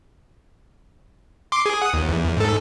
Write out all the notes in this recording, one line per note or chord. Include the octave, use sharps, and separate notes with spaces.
C6 D6
G#4
F#5 D#6
D#2
E2
G#2 A4